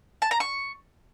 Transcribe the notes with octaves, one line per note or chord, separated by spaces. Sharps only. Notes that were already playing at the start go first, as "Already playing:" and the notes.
A5
A#5
C#6